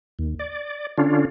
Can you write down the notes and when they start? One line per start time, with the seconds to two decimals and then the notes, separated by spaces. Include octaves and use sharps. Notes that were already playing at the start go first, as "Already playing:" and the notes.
0.19 D#2
0.39 D5
0.98 D3 C#4 D4 F4